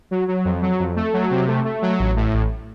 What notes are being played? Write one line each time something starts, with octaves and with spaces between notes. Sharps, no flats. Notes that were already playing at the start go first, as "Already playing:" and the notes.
F#3
F#3
F2
F#3
F2
A3
F#3
C3
A3
A3
F#3
A1
A2
A1